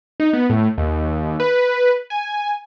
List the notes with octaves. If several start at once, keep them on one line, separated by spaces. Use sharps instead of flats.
D#4
B3
A2
D#2
B4
G#5